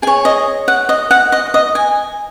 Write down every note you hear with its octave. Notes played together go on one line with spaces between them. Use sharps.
G#4 C#5 G#5
D#5
F#5
D#5
F#5
D#5
D#5
G#5